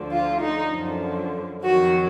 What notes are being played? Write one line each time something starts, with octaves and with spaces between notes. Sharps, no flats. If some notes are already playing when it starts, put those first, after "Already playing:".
Already playing: D2 D3 F3
F4
D#4
F#2 D3 F3
F2 D#3 F#3 F#4